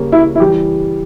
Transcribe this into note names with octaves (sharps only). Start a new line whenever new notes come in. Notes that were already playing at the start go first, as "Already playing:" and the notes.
Already playing: C#3 G3 A#3 C#4
E4
E4
E3 G3 G4